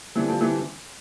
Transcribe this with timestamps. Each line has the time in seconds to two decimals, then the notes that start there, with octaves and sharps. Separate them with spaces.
0.16 D3 E3 G3 C4
0.28 F3
0.41 E3